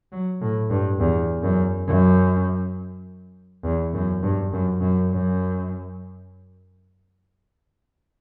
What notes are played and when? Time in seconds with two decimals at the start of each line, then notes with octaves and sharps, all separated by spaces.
0.12 F#3
0.41 A2
0.70 G2
1.00 E2
1.43 F#2
1.88 F#2
3.64 E2
3.93 F#2
4.23 G2
4.52 F#2
4.81 F#2
5.11 F#2